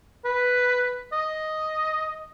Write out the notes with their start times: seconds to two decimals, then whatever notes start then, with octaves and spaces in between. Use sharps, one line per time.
0.25 B4
1.12 D#5